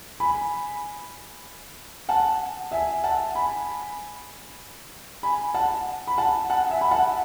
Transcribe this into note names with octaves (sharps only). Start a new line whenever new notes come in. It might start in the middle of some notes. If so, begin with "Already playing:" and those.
G#5 B5
F#5 A5
E5 G#5
F#5 A5
G#5 B5
G#5 B5
F#5 A5
B5
F#5 A5
F#5 A5
E5 G#5
B5
F#5 A5